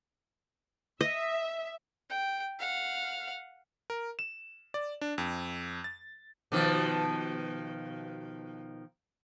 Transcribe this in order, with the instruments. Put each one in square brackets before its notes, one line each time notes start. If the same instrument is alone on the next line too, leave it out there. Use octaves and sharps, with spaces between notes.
[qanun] D#5 [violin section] E5
[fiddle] G5
F5 F#5
[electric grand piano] A#4
E7
D5
D4
F2
A6
[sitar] B2 D#3 F3